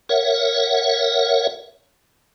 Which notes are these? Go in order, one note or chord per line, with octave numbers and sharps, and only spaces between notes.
A#4 C#5 E5 F#5